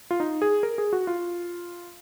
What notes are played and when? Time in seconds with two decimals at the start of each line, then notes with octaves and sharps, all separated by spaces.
0.11 F4
0.20 D#4
0.42 G#4
0.63 A#4
0.78 G#4
0.93 F#4
1.07 F4